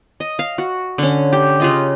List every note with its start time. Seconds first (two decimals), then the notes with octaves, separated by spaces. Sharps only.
0.20 D#5
0.39 F5
0.58 F#4
0.98 D3 C#4
1.33 G4
1.60 C#3 F4 D#5